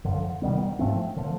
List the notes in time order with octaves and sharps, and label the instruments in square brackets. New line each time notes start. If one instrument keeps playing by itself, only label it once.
[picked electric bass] F#2 D3 F3
C3 D#3 G3 B3
G#2 F3 A3 C4
D3 F3 A3